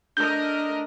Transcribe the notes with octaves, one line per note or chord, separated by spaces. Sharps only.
A3 D4 A#4 D#5 G6